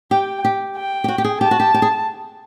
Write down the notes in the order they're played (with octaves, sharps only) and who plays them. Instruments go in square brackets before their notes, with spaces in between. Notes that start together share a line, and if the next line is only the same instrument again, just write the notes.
[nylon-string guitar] G4 [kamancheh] G5
[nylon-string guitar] G4
[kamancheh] G5
[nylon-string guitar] G4
F#4
G4
G#4
[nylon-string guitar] G4 [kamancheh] A5
[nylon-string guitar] F#4
G4
G4
G#4